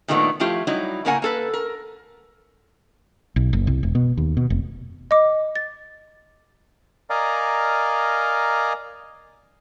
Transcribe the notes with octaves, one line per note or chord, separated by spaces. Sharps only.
A#2 D#3 F#3 A3 B3 D4
F3 A3 E4 F4 G4
F#3 G3 D#4 E4
A2 C#3 A#3 A#4 F#5 G#5
A#3 A4 B4
A#4
B1
F#1
C2
E1
B2
D#2
B2
F1
D#5 D6
A6
A#4 D5 D#5 F5 G#5 A#5